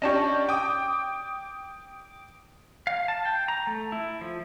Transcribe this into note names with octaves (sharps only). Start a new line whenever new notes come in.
C#4 D4 G4 D#5 A5 C#6
G5 D6 D#6
F5
A5
G5
A#5
A3
E4
F3